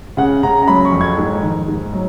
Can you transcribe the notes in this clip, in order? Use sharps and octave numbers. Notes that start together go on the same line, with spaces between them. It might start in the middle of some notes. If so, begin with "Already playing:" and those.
C#3 F#5
C#3 A#5
A#5
F#3 B5
C#6
F2
G#6
G#2
D#3
G#2
F#3